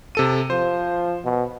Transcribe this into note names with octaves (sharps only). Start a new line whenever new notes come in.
C3 A4 D#7
F3 C5
B2